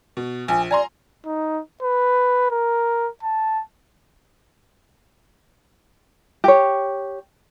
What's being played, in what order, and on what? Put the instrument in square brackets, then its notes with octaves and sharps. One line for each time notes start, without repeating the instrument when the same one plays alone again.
[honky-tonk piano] B2
[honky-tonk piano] A#1 [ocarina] G#5
[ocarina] D5 [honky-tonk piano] G#5 A#5 C6
[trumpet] D#4
B4
A#4
A5
[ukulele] G4 C#5